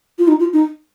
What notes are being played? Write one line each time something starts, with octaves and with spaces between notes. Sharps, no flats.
F4
D#4
F4
D#4